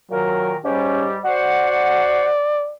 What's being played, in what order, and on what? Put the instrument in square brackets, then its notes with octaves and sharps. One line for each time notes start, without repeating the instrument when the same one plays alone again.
[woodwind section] A#2 D#3 A#4 [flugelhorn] F#3
[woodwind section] G#2 G3 G4 [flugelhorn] C#4
[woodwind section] F#4 C5 F#5 [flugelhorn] D5